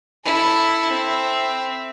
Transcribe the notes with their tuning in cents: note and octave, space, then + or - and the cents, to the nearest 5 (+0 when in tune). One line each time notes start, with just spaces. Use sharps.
E4 +0 A4 +0
C4 +0 E5 +0